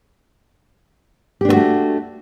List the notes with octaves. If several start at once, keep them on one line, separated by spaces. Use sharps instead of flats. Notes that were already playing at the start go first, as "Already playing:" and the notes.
A3 B3 D4 F#4 G4